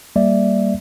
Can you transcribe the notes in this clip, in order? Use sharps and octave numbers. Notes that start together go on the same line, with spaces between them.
G3 A#3 D5 E5